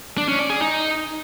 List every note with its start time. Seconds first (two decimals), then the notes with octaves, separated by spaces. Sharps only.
0.18 D4
0.28 C#4
0.39 D5
0.50 G#4
0.60 D#4